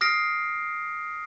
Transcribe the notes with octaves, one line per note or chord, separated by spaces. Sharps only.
D#6 F6 A#6 C7 D7